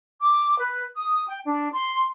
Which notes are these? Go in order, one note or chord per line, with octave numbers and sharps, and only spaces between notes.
D6
B4
D#6
G5
D4
C6